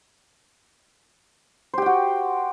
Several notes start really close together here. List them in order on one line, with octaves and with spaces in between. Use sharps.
C5 G4 G5 F#4